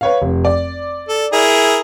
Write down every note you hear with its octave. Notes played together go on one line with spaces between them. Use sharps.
B4 C#5 F5
F1
D5
A4
E4 G#4 A#4